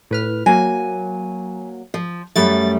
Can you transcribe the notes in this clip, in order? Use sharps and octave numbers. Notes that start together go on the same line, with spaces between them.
A2 B4 F6
F#3 A#3 G#5
F3
F#2 G3 A3 A6